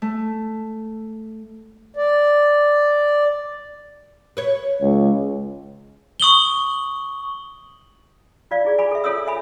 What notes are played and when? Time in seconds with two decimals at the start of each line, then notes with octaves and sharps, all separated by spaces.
0.02 A3
1.96 D5
4.37 B4 C#5
4.82 C#2
6.20 C#6 D#6 F#7 G7
8.51 F4 D5 F5
8.65 E4 G#4 D5
8.78 G#5 B5 D6
8.91 A4 E5
9.04 F4 A4 C#5 D#6 E6
9.27 E5 G#5 B5